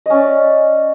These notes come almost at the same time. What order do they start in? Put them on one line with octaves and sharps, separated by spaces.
D#5 C#4 D5